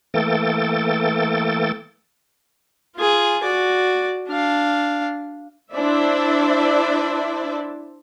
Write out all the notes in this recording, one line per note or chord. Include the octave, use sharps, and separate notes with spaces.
E3 A3 A#3 A4 G5 A6
F4 G#4
F#4 D5
D4 F5
D4 E4 C5 D5 E5